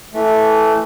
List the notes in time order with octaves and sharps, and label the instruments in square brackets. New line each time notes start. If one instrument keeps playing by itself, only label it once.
[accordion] E3 A3